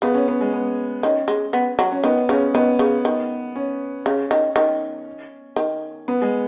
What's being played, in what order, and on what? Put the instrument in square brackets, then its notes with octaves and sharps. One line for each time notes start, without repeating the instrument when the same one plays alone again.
[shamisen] C#3 [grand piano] B3
[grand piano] C#4
B3
G#3
B3
[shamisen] D#3 [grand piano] C#4
[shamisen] G#3
B3
F#3
[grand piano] C#4
[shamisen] D#3 [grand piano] B3
[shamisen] C#3 [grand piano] C#4
[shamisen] D#3 [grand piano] B3
[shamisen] C#3
D#3
[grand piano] C#4
[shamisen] C#3 [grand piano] C#4
[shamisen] D#3
D#3
D#3
[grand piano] B3
G#3